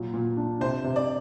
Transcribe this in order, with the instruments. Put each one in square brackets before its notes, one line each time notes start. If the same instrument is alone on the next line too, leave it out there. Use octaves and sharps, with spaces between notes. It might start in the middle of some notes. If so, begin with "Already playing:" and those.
Already playing: [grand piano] A#2 F#3
A#2
D4
[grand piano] C3 [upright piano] C5
[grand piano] C3
[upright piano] D5